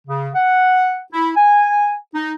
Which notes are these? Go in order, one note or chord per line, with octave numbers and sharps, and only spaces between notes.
C#3
F#5
E4
G#5
D#4